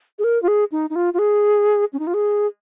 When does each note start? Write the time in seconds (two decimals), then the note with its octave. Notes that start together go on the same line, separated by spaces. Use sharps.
0.19 G#4
0.24 A#4
0.42 F4
0.48 G#4
0.72 D#4
0.90 D#4
0.95 F4
1.14 F4
1.19 G#4
1.93 C#4
1.99 D#4
2.07 F4
2.14 G#4